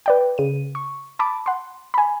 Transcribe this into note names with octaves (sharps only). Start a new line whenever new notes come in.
B4 D5 G5
C#3 D#7
C#6
A5 B5 D6
F#5 C6
G#5 B5